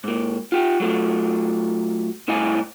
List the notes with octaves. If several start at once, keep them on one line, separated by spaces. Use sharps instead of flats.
G#2 A#3
F4 G4
F#3 A3 F4
C2 A2 E4 D#5 F5 G#5